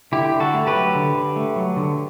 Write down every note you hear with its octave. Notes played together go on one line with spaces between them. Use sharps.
D3 E4 G4
D3
F#4 A4
A3
G4 B4
F#3
D3
D3
A3
F#3
D3